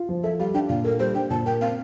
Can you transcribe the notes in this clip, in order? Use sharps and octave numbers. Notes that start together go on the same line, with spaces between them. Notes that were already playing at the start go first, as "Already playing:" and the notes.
Already playing: F4
F3
A4 E5
G3 F5
D4 G5
A#2 F5
A4 A#4
G3 C5
D4 G5
A#2 A5
A#4 G5
C4 F5